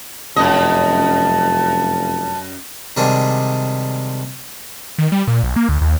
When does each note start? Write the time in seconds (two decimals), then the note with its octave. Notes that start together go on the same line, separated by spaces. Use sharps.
0.36 F1 F#2 D#5 A5
2.97 C3 D#3 G3 G#3 D4
4.98 D#3
5.12 G3
5.27 A#2
5.43 B1
5.56 A#3
5.69 D2
5.81 D#2